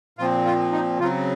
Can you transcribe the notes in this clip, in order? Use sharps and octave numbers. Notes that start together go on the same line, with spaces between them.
A#2 F3 C4 F4
F4
D#4
C#3 F#3 C4 F4